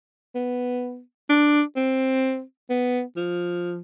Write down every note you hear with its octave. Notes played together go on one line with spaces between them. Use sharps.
B3
D4
C4
B3
F3